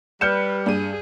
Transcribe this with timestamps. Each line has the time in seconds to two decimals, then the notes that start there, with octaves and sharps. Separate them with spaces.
0.21 G3 B4 F6 G6 C#7 E7
0.66 G2 G#4 D#7